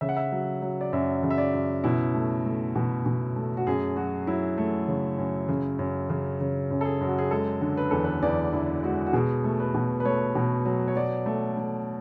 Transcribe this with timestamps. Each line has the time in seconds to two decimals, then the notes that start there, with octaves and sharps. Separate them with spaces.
0.01 C#3 E5
0.09 F#5
0.17 E5
0.32 F#3
0.62 F#3
0.81 D5
0.93 F#2 E5
1.23 C#3
1.30 E5
1.38 D5
1.54 F#2
1.84 B2 E4
2.15 A3
2.45 A3
2.76 B2
3.06 B2
3.36 A3
3.57 F#4
3.67 F#2 G#4
3.96 F#3 F#4
4.27 F#3 E4
4.58 A3
4.88 C#3
5.18 F#2
5.48 C#3
5.79 F#2
6.10 C#3
6.41 C#3
6.71 F#2
6.81 A4
6.85 G#4
7.01 F#2
7.07 F#4
7.18 G#4
7.31 G#3 A4
7.61 D3
7.77 B4
7.91 E2 A4
8.04 B4
8.22 E2 D5
8.53 D3 E4
8.83 G#3 F#4
9.07 F#4
9.13 B2 G#4
9.44 A3
9.60 B4
9.74 B2
10.00 B4
10.05 A3 C#5
10.35 B2
10.65 F#3
10.88 C#5
10.96 F#3 D5
11.26 A3
11.57 A3